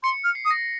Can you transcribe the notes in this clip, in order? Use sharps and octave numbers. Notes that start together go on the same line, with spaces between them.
C6 C#7
F6
C7
D#6
A#6